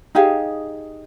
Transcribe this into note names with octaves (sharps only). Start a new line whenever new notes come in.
D#4 G4 G#4 F5